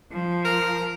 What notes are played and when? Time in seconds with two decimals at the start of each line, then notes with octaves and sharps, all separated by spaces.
0.12 F3
0.45 A#4